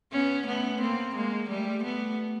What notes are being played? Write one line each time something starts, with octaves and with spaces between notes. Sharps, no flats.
B3 C#4
A3 B3
A#3 C4
G#3 A#3
G3 A3
A3 B3